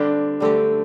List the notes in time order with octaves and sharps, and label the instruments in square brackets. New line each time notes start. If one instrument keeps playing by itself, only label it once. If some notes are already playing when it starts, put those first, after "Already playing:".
Already playing: [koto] D3 G3 C4 G4 [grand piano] D4
[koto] D3 G3 C4 G4 [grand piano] A3